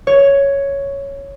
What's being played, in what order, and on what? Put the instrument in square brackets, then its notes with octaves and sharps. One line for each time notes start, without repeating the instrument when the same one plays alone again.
[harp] C#5